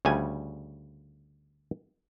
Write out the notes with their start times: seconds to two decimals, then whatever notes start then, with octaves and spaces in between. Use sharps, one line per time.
0.05 D2 C#3 G3 G#5